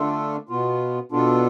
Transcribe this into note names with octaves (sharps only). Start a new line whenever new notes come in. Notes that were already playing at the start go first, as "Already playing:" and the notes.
Already playing: D3 A3 D4 F4 A4
B2 B3 F4
B2 B3 D4 F4 A4